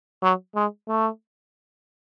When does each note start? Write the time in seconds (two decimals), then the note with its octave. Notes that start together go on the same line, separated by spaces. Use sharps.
0.23 F#3
0.56 G#3
0.88 A3